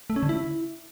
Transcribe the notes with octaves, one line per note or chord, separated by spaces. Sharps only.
A3
C#4
D3
E4